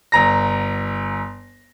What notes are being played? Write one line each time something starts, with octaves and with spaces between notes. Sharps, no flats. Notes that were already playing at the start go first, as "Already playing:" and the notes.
G1 A#5 A#6